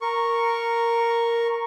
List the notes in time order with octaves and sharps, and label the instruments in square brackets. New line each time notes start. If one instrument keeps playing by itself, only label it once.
[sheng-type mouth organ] A#4 C#6